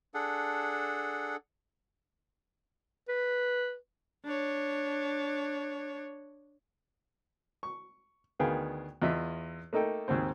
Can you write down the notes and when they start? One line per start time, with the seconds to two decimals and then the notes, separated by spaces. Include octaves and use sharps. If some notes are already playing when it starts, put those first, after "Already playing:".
0.14 D4 G#4 A4 F#5
3.08 B4
4.25 D4 C#5
7.63 C#6
8.39 D2 D#3 B3 G#4 F5 G5
9.02 E2 F4 D#5 E5
9.73 A3 A#3 D#4 A4 G5
10.08 D#2 G#2 C4 C5